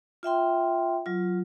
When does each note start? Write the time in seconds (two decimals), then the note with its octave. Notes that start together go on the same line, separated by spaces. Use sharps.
0.23 F4 E5 G5 C6
1.06 F#3 F4